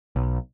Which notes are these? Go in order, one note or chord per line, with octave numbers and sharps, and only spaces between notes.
B1